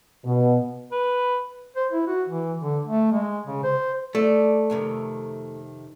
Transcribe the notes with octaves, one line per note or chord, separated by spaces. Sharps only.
B2
B4
C5
E4
F#4
E3
D3
A3
G#3
C#3
C5
A3 D5
F2 C3 D#3